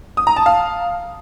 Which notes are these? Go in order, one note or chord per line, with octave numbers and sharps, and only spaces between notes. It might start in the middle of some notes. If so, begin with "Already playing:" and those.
D#6
A#5
A5
F5